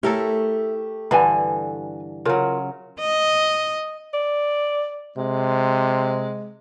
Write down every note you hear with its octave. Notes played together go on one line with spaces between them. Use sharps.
A3 E4 G4 A4 A#4 C#5
G2 D3 E3 G#5 A5 B5
C#3 F#3 F4 A#4
D#5
D5
C3 G#3